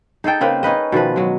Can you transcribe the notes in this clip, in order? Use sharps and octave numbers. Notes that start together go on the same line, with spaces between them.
D#4 G#4 A4 G5
C#3 A#3 C4 B4
C#4 D#4 B4 D#5
B2 D#3 F3 B4
F#3 G#3